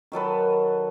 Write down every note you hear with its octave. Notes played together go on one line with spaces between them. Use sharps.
D#3 F#3 A4 B4